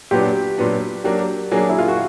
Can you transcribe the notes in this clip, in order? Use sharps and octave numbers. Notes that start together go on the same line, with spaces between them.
A#2 F#3 B3 D4 G4
A#2 F#3 B3 D4
F#3 A#3 D4 G4
F#3 A#3 D4 G#4
E4
F4
F#4